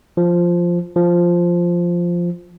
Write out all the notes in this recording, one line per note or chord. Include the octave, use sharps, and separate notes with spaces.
F3
F3